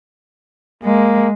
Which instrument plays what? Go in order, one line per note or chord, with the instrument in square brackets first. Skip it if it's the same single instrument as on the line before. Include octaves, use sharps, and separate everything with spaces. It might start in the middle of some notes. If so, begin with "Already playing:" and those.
[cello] G#3 [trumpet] A#3